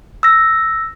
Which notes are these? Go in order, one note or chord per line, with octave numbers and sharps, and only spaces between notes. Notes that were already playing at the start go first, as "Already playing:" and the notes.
E6 A#6